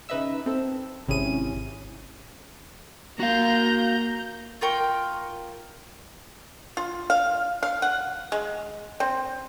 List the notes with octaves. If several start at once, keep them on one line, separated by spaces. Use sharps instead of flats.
C#3 D#4 B4 D#5 E5 E6
C4 A4
G#1 C3 C#4 E4 G#4 D#7
A#3 F#4 F5 A#5 G6
F4 A#4 G5 C#6
F4
F5
F5
F#5
G#3
C4